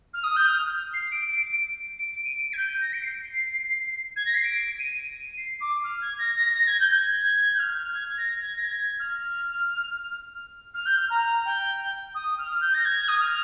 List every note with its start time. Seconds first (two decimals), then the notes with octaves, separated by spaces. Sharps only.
0.14 F6
0.24 D#6
0.36 G6
0.47 F6
0.94 C7
1.11 D7
1.29 D7
1.46 D7
1.99 D7
2.25 D#7
2.34 D7
2.53 G#6
2.57 G6
2.81 A#6
2.93 D7
3.04 C7
4.16 G#6
4.26 A#6
4.35 C7
4.44 D7
4.79 D#7
5.37 C7
5.61 D6
5.84 F6
6.02 G#6
6.19 A#6
6.36 A#6
6.54 A#6
6.67 G#6
6.80 G6
6.93 G#6
7.24 G#6
7.54 G6
7.59 F6
7.95 G#6
8.18 A#6
8.41 G#6
8.56 A#6
8.64 G#6
8.99 F6
10.74 F6
10.86 G6
10.97 F6
11.10 A#5
11.45 G5
12.15 D#6
12.38 F6
12.61 G6
12.74 A#6
12.85 G#6
13.08 D#6
13.20 F6